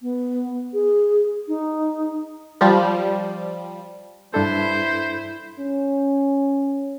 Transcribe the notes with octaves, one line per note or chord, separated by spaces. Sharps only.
B3
G#4
D#4
F3 G3
G2 D4 E4 A4 C5
C#4